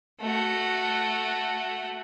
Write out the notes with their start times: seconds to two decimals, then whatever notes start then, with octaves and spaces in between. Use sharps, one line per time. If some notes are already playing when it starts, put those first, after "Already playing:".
0.21 A3 F#4